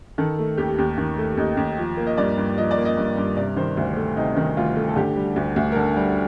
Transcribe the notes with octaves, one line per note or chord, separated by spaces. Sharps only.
D#3 A4
A3
D#2 G4
D#2
D#3
A3
D#2 D#4
D#2
F3
A#3
D#5
G2 D5
G2
F3 D#5
D5
A#3
D#5
G2
G2
C3 D5
D#3 C5
D2
A3
C3 D#4
D#3
D2 F4
A3
A4
D3 G4
G3
D2
D2
A#4
D3 A4
G3